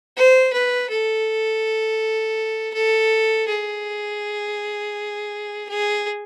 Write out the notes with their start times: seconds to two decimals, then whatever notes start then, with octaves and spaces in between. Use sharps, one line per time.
0.16 C5
0.53 B4
0.90 A4
2.74 A4
3.48 G#4
5.69 G#4